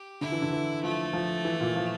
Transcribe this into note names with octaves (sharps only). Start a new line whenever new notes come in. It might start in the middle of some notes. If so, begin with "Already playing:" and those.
Already playing: G4
D3 E4
E3
D3
E3
F3 A3
F3
E3
A#2
F3